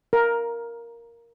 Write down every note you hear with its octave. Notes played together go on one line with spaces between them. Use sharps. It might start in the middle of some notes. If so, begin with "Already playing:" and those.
A#4